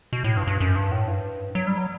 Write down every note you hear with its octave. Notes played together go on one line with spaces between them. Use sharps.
B2
A2
G2
G2
F#2
G2
A2
G2
F#3
G3
F#3